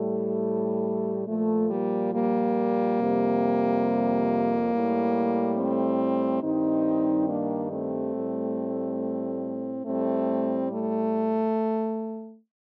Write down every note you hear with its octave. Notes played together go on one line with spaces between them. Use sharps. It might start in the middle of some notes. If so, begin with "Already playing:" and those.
Already playing: A2 G3 A3
A#2 F3 A3
G3 A#3
G3 A#3
F2 C3 G3
A2 G3
A3 C4
G2 D#3 G3 C4 D#4
A#3 D4
A3 C4
A2 G3
A2 G3 A3 C4
A3